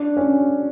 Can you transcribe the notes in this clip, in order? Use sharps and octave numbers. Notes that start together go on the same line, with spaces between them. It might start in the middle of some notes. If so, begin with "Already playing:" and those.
Already playing: D4
C#4